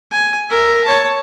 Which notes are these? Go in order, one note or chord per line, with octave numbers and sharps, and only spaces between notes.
G#5
A#4 E5
C#5 A5